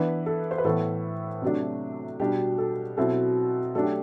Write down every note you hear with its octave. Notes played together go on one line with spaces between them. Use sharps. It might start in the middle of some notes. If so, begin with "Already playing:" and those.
Already playing: E3 B3 D4 B4
A4
C5
B4
A2 E3 B3 A4
C3 F#3 A3 D4
B2 G3 D4 G4
A4
B2 F#3 C4 E4 A4
F#3 A3 D4 A4
G4